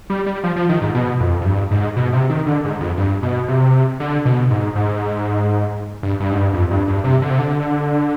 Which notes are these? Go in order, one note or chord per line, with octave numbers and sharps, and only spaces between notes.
G3
G3
F3
F3
D#3
G#2
B2
F2
F2
G2
G#2
B2
C3
D#3
D3
G#2
F2
G2
B2
C3
D3
B2
G#2
G#2
G2
G2
G#2
G2
F2
G2
G2
C3
D3
C3
D3